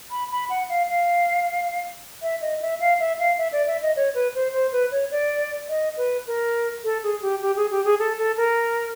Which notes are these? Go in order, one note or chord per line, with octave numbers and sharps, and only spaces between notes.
B5
B5
F#5
F5
F5
E5
D#5
E5
F5
E5
F5
E5
D5
E5
D#5
C#5
B4
C5
C5
B4
C#5
D5
D#5
B4
A#4
A4
G#4
G4
G4
G#4
G4
G#4
A4
A4
A#4